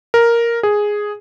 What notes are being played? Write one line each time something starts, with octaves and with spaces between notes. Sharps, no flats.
A#4
G#4